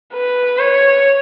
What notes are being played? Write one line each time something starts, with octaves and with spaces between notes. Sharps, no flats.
B4
C#5